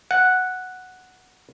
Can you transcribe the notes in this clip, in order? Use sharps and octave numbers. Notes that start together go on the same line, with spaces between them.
F#5